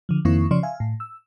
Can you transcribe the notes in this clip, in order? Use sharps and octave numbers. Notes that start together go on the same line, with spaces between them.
D3 F3
F2 D#3 A#3 C4 E4 C#6
C#3 F3 C#4 C#5 D5 C6
E5 F5 G#5
A2
E6